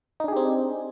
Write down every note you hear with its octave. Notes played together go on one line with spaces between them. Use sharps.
C4 D4 D#4 G4 G#4